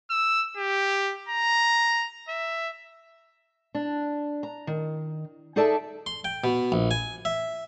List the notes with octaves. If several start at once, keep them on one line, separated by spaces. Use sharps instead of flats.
E6
G4
A#5
E5
D4
A#5
D#3
D#4 G#4 A4 D5 E5 A5
C6
G5
B2
A#1
G#5
E5